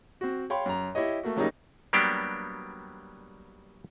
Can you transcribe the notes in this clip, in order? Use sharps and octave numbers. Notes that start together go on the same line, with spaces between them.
C4 F#4
C#5 F5 G5 B5 C6
F#2 A#5
E4 G4 C#5 D#5
A3 A#3 F#4
C#3 F#3 G3 A#3 D#4
F#3 G3 A#3 B3 D4 G4